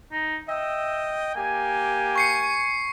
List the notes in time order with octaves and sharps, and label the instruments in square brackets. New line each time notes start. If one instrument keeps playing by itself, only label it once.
[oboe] D#4
[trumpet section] D#5 G5 [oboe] E5
[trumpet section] A#3 G4 [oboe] G#5
[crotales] C#6 C7 C#7